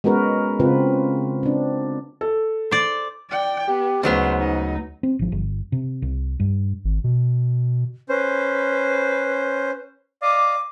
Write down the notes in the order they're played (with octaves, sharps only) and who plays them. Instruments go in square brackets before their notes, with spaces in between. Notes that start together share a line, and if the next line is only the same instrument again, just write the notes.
[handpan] G#3 B3 C#4 F#4 A#4 B4
C#3 C4 F4 B4
C4 D4
[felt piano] A4
[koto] C5 D5
[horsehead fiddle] D5 G5
[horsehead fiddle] B3 [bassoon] G4
[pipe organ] D2 [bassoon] G#2 [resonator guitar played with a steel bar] C#3 F#3 B3 [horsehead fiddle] B4 C5
[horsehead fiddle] D#4
[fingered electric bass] C4
G#1 F3
G1
C3
C2
G2
[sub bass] G#1
B2
[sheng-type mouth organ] C#4 C5 [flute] B4
[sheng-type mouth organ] D5 D#5 F5 [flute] D6